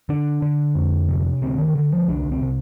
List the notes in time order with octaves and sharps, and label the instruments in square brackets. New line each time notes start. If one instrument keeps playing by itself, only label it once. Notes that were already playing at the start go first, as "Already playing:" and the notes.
[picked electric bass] D3 D4
D3
F2
C3
D2 C4
D#3
D2 D3
F3
C2 D4
C4
C3